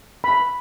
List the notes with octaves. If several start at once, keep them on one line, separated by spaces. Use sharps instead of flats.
B5